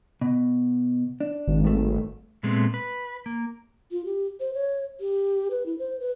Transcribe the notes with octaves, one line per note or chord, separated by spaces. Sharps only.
B2
D4
G#1
G2 A3
A#2 G#3 A3 B3 C4
B4
A#3
F4
G4
C5
C#5
G4
B4
E4
C5
B4